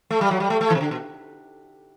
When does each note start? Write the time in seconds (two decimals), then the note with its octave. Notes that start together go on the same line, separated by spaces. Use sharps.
0.10 A3
0.21 G3
0.31 F#3
0.40 G3
0.50 A3
0.61 A3
0.70 E3
0.75 C3
0.81 D3
0.91 B2